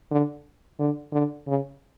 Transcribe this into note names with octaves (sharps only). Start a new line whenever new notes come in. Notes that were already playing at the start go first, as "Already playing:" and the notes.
D3
D3
D3
C#3